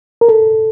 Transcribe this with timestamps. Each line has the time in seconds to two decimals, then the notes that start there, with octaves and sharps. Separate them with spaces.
0.21 A#4
0.29 A4